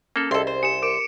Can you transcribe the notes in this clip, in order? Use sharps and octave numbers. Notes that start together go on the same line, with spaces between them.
A#3 C#4 A4
C2 G#4 A4 D#5 C6
C5
G4 G#5 C#7 E7
A#4 D6 D7